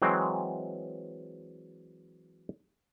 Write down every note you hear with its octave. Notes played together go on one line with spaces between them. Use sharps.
E3 F#3 G#3 C4